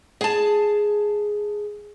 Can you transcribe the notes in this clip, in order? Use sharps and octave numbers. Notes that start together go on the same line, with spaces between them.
G#4 A5